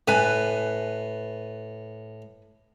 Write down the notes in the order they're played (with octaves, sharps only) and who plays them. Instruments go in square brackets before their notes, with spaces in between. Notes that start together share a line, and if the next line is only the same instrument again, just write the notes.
[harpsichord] A2 [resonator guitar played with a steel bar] B4 G#5